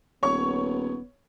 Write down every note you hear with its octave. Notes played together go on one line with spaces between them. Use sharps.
D#1 B3 C#5 C#6